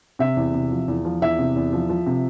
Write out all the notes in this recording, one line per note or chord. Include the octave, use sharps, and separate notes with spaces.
C3 E5
E2
C3
F3
E2
F3
E2 E5
C3
E2
F3
F3
C3